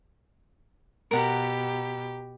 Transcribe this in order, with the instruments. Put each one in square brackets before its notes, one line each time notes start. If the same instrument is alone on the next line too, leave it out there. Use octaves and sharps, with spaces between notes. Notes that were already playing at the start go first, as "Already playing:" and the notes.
[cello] B2 G4 [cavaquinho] A#4 F#5 A#5